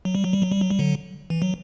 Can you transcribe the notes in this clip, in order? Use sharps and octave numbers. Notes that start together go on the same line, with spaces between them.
F#3
G3
F#3
G3
F#3
G3
F#3
G3
D3 F#3
E3
F#3